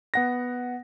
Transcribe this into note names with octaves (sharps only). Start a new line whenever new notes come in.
B3 F#5 A#6